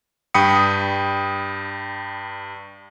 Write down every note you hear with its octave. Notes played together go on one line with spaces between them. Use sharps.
G2 G5 B5 D#6 C#7